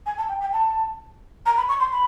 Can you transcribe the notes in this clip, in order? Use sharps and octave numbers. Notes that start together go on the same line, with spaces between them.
G#5
A5
G5
G5
A5
A#5
B5
C#6
C6
B5